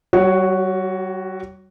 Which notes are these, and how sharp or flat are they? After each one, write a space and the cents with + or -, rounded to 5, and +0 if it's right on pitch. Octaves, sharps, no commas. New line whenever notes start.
G3 -40 F#4 +0 C#5 +0